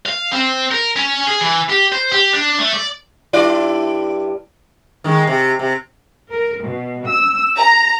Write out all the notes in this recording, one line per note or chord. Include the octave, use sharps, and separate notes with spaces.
F5
C4
A#4
C#4
G#4
E3
G4
C5
G4
D4
A3
D5
G2 E4 D5
D#3 G#3
C3
C3
A#4
B2
E6
A#5